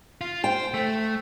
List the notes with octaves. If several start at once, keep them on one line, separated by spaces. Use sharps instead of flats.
F4
C5 G5
A3